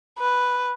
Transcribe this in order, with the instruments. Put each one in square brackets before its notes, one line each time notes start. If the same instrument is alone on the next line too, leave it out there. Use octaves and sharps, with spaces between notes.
[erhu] B4